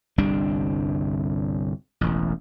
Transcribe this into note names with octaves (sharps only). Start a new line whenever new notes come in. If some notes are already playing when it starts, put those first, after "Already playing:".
G1 C2 G3 D4
E1 A1